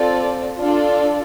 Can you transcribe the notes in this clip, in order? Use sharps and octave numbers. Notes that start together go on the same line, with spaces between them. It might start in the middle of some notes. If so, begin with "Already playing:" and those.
Already playing: C4 F4 A4 D5
D4 F4 A4 D5